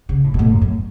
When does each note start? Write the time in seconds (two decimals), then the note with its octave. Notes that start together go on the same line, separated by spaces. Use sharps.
0.09 C#3
0.24 A2
0.34 B2
0.39 A2
0.50 F#2
0.61 F#2